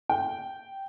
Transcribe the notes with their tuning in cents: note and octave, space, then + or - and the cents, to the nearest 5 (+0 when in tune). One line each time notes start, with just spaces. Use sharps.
G5 -10